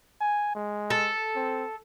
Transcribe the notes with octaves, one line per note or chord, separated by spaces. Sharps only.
G#5
G#3
A4
C4